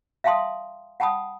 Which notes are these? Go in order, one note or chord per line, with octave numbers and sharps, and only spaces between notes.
E5 F5 G5 A5 C6 D#6
F#5 G5 A5 B5 D#6